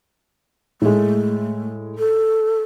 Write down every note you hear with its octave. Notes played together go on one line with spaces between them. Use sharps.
A2 G#3 A3
A4